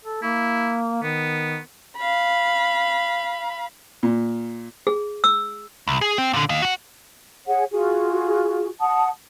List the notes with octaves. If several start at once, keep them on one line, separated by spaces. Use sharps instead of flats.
A4
A#3 E4
D#3 B3
F5 B5
A#2
G#4
E6
C2
G#4
C4
A#2 D3
D#5 F5
F#4 F#5
G#4 C#5 F#5
F4 F#4 G#4
F#5 A5 D#6